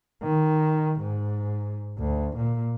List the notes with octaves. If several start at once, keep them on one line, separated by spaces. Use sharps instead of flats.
D#3
G#2
D2
A#2